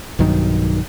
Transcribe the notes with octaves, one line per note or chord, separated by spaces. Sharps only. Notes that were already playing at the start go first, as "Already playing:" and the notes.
B1 G2 D#3 F#3